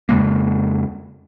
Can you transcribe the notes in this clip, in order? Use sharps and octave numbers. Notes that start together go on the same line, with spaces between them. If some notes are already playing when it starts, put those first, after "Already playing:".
F2 C#3 G#3 A#3